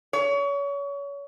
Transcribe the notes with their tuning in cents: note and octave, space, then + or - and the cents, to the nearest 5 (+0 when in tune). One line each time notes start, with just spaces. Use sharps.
C#5 +30